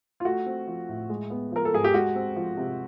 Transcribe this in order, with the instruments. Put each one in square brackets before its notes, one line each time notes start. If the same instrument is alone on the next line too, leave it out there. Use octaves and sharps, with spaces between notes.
[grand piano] F4
A3 F#4
C4
F3
A2
G#3
B3
F3 A#4
A4
G#2 G#4
G4
G#3 F#4
C4
F3
C3